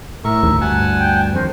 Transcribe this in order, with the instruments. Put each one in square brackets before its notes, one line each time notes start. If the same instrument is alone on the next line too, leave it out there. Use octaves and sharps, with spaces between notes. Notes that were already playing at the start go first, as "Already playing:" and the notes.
[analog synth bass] A2 [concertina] A#4 E5 C#6
[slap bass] D2
[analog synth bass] G2 [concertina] F#5 G#5 A5
[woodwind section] G5
[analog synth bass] F2 [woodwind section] D#3 D4 C5